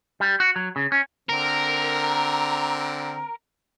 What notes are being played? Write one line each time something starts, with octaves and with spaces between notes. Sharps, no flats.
G3
F#4
F#3
C#3
C#4
D3 C4 A#4